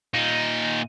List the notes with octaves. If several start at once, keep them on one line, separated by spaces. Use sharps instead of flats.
A#2 D#4